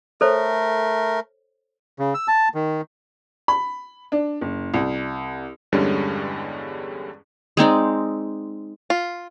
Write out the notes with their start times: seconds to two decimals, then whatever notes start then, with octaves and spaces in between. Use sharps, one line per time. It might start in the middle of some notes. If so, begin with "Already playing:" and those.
0.21 A3 A4 A#4 C5 C#5
1.99 C#3
2.14 E6
2.28 A5
2.54 D#3
3.48 B5
4.12 D4
4.41 F#1
4.74 C2
5.72 E2 G2 D3 G3 G#3 C#4
7.57 G#3 C4 D#4 D5
8.90 F4